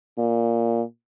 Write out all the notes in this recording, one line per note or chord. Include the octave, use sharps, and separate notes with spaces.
A#2